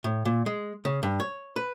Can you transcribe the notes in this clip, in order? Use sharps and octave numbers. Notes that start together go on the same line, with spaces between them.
A2
A#2
G#3
C#3
G2
C#5
B4